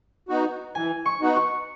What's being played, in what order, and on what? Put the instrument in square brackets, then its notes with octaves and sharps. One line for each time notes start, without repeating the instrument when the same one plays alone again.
[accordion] B3 D#4 F#4
[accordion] E3 [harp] G#5
[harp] C#6
[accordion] B3 D#4 F#4
[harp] C#6